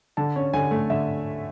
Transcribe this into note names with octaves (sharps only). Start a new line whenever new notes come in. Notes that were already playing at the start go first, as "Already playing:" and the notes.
D3 A5
C#4
D3 G#5
A3
D3 E5